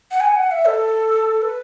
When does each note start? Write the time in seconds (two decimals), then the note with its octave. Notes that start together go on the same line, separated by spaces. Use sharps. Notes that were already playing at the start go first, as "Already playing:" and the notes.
0.11 F#5
0.20 G#5
0.36 F#5
0.51 E5
0.65 A4
1.42 B4